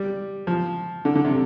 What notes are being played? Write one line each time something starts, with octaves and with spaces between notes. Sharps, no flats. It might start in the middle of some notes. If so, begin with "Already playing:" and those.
Already playing: G3
F3
D3
D3
C3